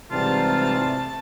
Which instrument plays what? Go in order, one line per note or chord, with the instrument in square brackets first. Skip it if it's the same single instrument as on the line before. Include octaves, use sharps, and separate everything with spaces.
[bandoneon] G#2 E3 G3 [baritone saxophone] C3 [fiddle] A3 A5 [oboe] F4